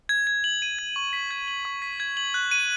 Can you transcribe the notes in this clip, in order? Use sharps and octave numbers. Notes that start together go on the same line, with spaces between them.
G#6
G#6
F#7
D#7
G#6
C#6
B6
G#6
F#7
C#6
B6
G#6
F#7
F#6
D#7